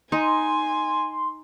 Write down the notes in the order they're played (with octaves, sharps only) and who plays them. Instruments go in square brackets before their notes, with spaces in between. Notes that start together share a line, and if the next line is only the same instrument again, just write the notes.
[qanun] D#4 [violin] G#5 [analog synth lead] C6